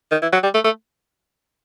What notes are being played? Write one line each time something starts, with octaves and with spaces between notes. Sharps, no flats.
D#3
E3
F#3
G3
A3
A3